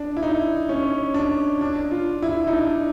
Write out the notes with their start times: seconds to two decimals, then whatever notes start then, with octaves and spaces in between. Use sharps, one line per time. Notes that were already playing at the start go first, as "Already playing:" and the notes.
Already playing: D4
0.17 E4
0.23 D#4
0.69 C#4
1.14 D4
1.61 D4
1.91 F4
2.23 E4
2.47 D#4
2.52 D4